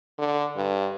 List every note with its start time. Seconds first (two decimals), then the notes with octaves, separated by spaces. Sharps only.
0.19 D3
0.57 G2